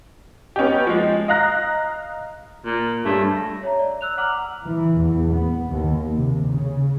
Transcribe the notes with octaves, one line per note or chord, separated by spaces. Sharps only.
B3 C#4 D#4 G4
F3 G#3
D#5 F5 A#5 F#6 A#6
A#2
G2 C#3 A3
A#6
C#5 E5 A#5
D5
E6 F#6 F7
F#5 A#5 D6 F6 F#7
E3
E2
B3
D#2
C3
C#3